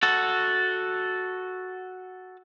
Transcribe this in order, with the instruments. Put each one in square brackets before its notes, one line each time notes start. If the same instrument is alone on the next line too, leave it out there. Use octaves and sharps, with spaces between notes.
[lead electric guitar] F#4 A4